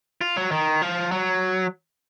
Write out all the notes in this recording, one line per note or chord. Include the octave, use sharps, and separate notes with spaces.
F4
F#3
D#3
F3
F#3